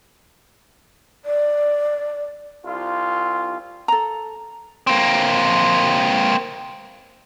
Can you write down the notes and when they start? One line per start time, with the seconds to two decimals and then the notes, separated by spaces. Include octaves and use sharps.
1.25 D5
2.65 C2 F4
3.88 A4 A#5
4.87 A#3 C4